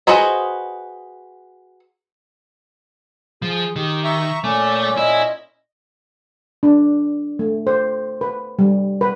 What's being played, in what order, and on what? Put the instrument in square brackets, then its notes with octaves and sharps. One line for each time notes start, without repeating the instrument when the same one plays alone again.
[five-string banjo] F#4 G#4 B4 C5 D#5
[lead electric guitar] F3 [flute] G#4
[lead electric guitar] D#3 [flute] G4
[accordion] E5 A#5 C#6
[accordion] A#2 C#4 [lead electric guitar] A3 [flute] D6
[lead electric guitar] E4 [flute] D#5
[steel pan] D4
A3
C5
B4
G3
B4